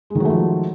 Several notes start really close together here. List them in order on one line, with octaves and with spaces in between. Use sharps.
G#3 D#3 F#3 A3 F3